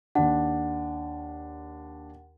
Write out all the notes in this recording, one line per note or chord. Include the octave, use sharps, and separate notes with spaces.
D#2 D4 F#5